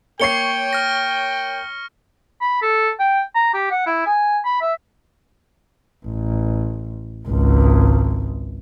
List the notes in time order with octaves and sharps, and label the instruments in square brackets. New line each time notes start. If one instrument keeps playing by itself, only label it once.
[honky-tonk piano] A#3 C#5 C7 [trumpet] G5 [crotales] C#6 C#7 G7
[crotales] F6 A#6
[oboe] B5
A4
G5
A#5
G4
F#5
E4
G#5
B5
E5
[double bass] A1
G#1 C#2